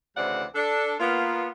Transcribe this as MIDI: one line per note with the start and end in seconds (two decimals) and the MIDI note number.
0.16 0.44 38
0.16 0.44 49
0.16 0.44 52
0.16 0.44 60
0.16 0.44 74
0.16 0.44 78
0.55 0.94 62
0.55 0.94 69
1.00 1.49 58
1.00 1.49 59
1.00 1.49 65